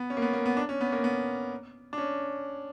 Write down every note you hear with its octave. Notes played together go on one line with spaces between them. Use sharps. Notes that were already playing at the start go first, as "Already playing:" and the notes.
Already playing: B3
C#4
A#3
B3
A#3
B3
D4
C#4
B3
A#3
B3
D4
C#4